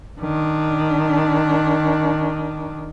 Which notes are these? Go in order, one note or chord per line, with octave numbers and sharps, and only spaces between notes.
D#3 D4